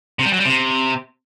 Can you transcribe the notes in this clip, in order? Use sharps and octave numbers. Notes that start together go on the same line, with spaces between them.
C3
G3
F#3
G3
C3